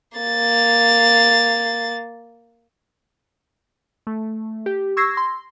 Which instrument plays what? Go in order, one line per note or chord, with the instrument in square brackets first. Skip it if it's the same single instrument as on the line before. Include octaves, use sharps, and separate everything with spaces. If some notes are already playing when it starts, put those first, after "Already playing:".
[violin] A#3 A6
[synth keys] A3
G4
C#6 E6 G#6 A#6 C7
C6